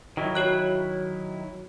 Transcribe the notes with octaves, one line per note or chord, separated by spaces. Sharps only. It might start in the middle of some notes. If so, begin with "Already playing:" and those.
D#3 F#3 E4
F#4 C#5 F#6